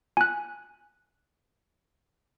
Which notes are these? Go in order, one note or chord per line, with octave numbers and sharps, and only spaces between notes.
G#5 F#6